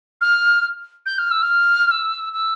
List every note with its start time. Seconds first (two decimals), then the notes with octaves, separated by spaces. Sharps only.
0.21 F6
1.06 G6
1.18 F6
1.31 E6
1.42 F6
1.91 E6
2.33 E6